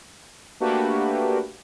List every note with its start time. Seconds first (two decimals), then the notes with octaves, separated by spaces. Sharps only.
0.60 A3 A#3 D4 F#4 G4 B4